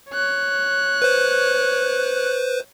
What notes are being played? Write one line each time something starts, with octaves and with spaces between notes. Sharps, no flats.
C#5 F#6
B4 C5